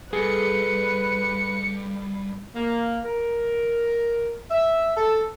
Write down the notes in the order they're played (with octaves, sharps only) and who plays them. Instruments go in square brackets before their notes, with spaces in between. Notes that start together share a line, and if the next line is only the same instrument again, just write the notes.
[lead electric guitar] G2 [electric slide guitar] G#4 A4 [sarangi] B4 [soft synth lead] C#7
[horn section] A#3
A#4
E5
A4